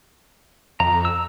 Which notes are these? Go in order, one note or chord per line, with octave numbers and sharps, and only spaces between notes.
F2 A#5
E6